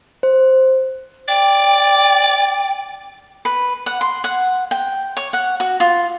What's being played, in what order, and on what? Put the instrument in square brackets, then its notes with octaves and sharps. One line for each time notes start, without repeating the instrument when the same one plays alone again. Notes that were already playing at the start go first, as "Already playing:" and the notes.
[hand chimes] C5
[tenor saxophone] D5 [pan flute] G5
[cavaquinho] B4
F#5
C6
F#5
G5
C#5
F#5
F#4
F4